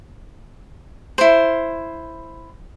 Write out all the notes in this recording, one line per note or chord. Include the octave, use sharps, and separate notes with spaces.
E4 C5